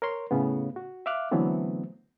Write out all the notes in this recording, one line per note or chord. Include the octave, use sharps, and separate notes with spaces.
A#4 C#5 C6
A2 C#3 B3
F#4
E5 F5 D6 F6 F#6
D3 E3 F#3 A3 B3 C4